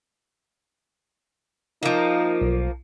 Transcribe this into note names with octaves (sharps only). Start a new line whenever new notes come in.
F3 A#3 D#4 F4
B1